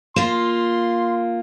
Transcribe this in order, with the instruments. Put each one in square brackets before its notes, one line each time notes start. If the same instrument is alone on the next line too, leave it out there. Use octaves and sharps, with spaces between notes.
[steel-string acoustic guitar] A#3 F4 [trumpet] C6